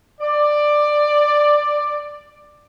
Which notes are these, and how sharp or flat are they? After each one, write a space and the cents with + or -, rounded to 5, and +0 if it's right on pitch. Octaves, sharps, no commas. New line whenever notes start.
D5 +10